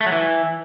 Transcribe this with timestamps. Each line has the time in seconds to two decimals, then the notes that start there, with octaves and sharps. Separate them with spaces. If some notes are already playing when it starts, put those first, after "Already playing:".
0.01 A3
0.06 F#3
0.12 E3